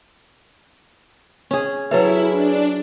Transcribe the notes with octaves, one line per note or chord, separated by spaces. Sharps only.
C#4 G#4
F#3 E4 G#4 A4 B4 C#5 E5 F5
D4